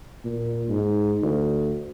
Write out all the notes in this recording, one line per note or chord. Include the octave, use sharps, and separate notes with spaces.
A#2
G#2
D2